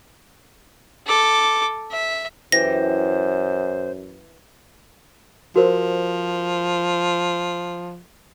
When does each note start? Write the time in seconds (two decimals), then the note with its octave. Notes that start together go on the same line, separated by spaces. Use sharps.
1.07 A4 D6
1.91 E5
2.52 F#2 E3 G4 C5 A#6
5.56 F3 F#4 A#4 C5